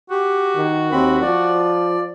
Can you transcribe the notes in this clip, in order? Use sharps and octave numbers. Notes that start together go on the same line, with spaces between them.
F#4 G4
D#3
D#2 C4 B5
F3 D5